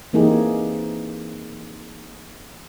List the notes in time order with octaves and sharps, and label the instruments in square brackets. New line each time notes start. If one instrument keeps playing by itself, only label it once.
[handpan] E3 A#3 C4 D#4 G4 G#4